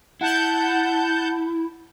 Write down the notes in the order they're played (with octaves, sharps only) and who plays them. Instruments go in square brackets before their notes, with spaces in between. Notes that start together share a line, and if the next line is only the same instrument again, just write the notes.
[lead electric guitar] E4 [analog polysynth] F#5 A5 G6